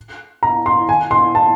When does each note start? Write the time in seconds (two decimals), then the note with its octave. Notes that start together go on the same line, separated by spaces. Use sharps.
0.43 A#5
0.66 C6
0.89 G#5
1.11 C6
1.35 A5